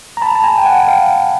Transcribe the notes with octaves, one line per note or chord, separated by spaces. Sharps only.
A#5
A5 B5
A5
G#5 A#5
G5
F#5 G#5
F5 G5